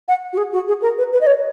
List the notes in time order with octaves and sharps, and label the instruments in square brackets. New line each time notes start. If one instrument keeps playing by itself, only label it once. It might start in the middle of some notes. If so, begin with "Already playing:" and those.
[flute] F#5
F#4
G#4
F#4
G#4
A#4
B4
B4
D#5
C#5